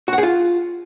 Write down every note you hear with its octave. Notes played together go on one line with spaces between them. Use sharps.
F#4
F#5
G#4
F4